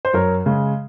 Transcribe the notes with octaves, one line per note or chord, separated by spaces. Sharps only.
C5
F#2 A#4 C#5
C#3 G#3